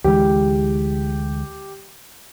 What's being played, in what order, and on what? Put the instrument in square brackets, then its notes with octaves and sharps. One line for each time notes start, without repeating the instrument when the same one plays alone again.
[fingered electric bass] D2 E3 G#3 [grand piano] G4